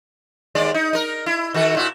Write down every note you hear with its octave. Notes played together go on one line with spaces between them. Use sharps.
D#2 G#3 D5
D#4
D#4 A#4
E4
D#3 F#4 A4
A#2 E4 F#4